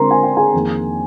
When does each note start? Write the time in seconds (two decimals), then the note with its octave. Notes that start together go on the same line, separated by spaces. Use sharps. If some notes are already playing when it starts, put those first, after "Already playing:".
Already playing: D3 G#3 C4 A#4 C5 A#5 C6
0.11 G#5
0.23 G5
0.37 G#4 G#5
0.53 F2 D#3 A#3